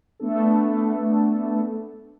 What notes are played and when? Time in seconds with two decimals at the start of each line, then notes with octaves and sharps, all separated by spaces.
0.20 A3 B3 D4 A4